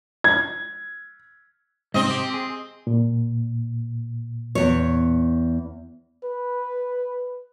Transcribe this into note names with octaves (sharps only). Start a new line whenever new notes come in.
G#6
G#2 C3 C4 D#5
G4
G#4
A#2
E2 C#5
B4